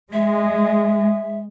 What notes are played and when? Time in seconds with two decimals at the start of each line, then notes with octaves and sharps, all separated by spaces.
0.13 G#3 E5